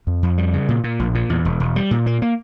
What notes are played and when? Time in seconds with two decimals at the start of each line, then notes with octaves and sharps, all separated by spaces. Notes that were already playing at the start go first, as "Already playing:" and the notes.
0.07 F2
0.23 F2
0.38 G3
0.54 C#3
0.69 A#2
0.84 A#2
0.99 A#1
1.15 A#2
1.30 E2
1.45 E1
1.60 E1
1.76 G3
1.91 A#2
2.06 A#3
2.22 A#3